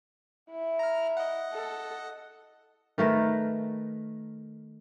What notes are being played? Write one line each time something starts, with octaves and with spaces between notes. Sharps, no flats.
E4
A#5 F6
D#5 F#5
A4
D#3 A3 A#4 B4